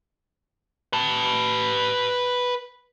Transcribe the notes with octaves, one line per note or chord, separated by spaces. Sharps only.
B4 A5